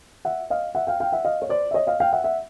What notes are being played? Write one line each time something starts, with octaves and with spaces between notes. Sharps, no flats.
E5 F#5
D#5 F5
E5 F#5
F5 G5
F5 G5
E5 F#5
D#5 F5
C#5
C5 D5
E5
C#5 D#5
D#5 F5
F5 G5
E5 F#5
E5 F#5